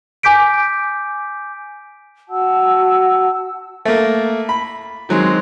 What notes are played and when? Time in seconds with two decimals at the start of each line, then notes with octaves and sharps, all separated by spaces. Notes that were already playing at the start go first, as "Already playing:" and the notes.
0.23 G#5 D6 G6 B6 D7
2.28 F#4 F#5 A5 E6
3.85 A3 A#3
4.49 B5
5.09 D#3 F#3 G#3 C4